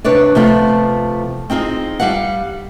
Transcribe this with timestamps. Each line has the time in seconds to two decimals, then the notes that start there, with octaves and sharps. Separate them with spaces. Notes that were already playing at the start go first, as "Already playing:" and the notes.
0.04 C3 D4 B4 C#5 D5
0.35 C3 F3 A3 B3 F4
1.50 C4 D#4 F4 G#4
2.00 G3 F5 F#5